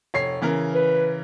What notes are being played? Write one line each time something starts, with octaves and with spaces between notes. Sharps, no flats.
F1 C#5 C7
C#3 E3 A#4
B4